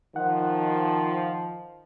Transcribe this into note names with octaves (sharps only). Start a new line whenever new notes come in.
D#3 F3 F#5